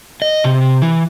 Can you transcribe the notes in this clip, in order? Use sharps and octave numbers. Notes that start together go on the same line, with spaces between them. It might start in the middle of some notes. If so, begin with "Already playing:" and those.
D#5
C3
E3